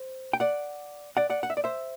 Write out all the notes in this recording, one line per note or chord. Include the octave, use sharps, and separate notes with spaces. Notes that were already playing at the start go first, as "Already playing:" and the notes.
Already playing: C5
G5
D5 F#5
D5 F#5
D5 F#5
F#5
E5
D5
C5 E5